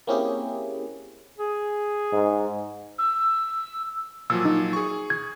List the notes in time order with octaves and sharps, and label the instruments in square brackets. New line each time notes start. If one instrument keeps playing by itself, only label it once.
[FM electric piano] A#3 C4 C#4 E4 G4 G#4
[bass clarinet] G#4
[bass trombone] G#2
[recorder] E6
[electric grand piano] A#2 F3 F#3 [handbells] E6
[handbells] D#4
[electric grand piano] G#4 C#6
[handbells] G#6